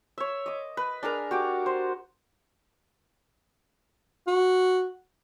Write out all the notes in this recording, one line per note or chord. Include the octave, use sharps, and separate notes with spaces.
C#5 E5
D#5 D6
B4
D4 G#4 A#4 A#5
F#4 G4 D6
C5
F#4